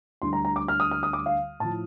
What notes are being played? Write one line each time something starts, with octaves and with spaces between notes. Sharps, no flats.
D2 D3 G3 C6
A#5
A#5
D6
F6
D#6
F6
D#6
D6
F5
A2 F3 A5